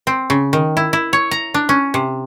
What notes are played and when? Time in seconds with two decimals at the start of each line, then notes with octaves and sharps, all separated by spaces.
0.07 C4
0.30 C#3
0.53 D#3
0.77 E4
0.93 E4
1.13 C#5
1.31 A#5
1.54 D4
1.69 C#4
1.94 C3